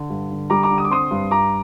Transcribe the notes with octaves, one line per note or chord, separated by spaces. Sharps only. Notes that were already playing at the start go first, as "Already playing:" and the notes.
Already playing: D3
G2
D3
G3 A#5 D6
A#5 D6
D3
D#6
D6
C4 C6 D#6
G2
G2 A#5 D6